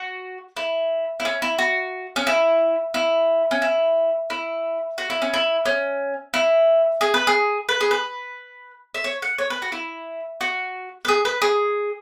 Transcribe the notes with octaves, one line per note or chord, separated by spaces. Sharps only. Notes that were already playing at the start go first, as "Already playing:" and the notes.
Already playing: F#4
E4
E4
C#4
E4
F#4
C#4
E4
E4
C#4
E4
E4
F#4
E4
C#4
E4
C#4
E4
G#4
B4
G#4
B4
G#4
B4
E5
C#5
F#5
C#5
B4
F#4
E4
F#4
B4
G#4
B4
G#4